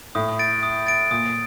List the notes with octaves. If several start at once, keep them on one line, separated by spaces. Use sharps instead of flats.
A2 D#6
A6 D7
D#6
A6 D7
A#2 D#6